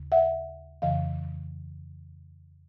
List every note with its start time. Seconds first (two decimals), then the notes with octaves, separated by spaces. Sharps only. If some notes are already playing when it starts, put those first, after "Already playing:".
Already playing: D#2 C#3
0.12 E5 F#5
0.82 F2 C#3 E3 D#5 F5